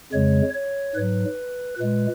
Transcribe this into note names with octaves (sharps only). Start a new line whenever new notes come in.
F2 C#3 G#3 C#5
C#5
G#2 F#3 B4
A#2 G#3 B4